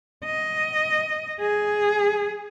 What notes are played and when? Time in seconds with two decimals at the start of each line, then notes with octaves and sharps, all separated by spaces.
0.25 D#5
1.41 G#4